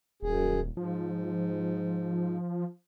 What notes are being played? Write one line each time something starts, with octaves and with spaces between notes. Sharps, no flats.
D#1 F#2 G#4
G#2 F3